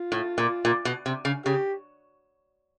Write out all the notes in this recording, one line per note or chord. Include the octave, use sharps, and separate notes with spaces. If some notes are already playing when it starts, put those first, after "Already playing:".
Already playing: F4
A2
A#2
A#2
B2
C3
C#3
C#3 G4